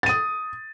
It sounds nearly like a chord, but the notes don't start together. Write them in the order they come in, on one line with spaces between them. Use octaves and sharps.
A6 D#7 D#6